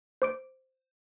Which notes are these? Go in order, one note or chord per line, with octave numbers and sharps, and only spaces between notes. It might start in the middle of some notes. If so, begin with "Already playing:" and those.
C5 D6 D7